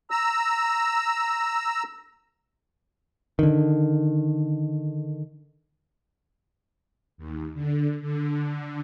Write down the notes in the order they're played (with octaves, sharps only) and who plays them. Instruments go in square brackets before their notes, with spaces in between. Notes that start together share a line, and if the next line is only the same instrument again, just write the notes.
[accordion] A#5 E6
[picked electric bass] D3 D#3
[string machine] D#2
D3
D3